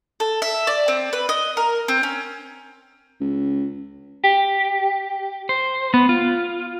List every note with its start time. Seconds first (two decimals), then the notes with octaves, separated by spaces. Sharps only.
0.20 A4
0.42 E5
0.67 D5
0.88 C4
1.13 B4
1.29 D#5
1.57 A#4
1.88 C4
2.03 C#4
3.20 C#2
4.24 G4
5.49 C5
5.94 B3
6.09 F4